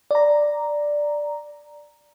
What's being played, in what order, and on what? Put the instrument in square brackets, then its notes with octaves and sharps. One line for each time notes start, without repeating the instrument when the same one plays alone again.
[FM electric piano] D5 A#5